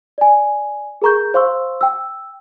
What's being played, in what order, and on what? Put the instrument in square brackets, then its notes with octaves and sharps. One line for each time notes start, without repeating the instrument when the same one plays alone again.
[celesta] D5 G#5
G#4 A#4 A#5 C#6 G6
C5 F5 C6 C#6 E6
G5 E6